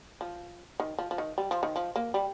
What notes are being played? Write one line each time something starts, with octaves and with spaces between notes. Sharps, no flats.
F3
D#3
F3
F3
D#3
G3
F3
D#3
F3
A#3
G3